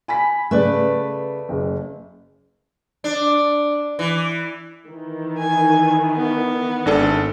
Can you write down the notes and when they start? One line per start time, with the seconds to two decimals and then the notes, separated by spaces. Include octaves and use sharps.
0.08 G#5 B5 B6
0.51 C#3 A3 B4 D5
1.49 F#1
3.04 D4
3.99 E3
4.87 D#3 E3
5.38 G#5
6.17 B3
6.86 G#1 D4 A4